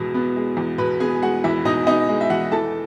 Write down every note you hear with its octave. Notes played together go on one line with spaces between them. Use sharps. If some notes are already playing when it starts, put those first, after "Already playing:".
Already playing: E2 B2 G#3
B3
G#3
E2
B2 B4 B5
B3 G#4 G#5
G#3 F#4 F#5
E2 E4 E5
B2 D#4 D#5
B3 D#4 D#5
G#3
E5
E2 F#4 F#5
E3 A4 A5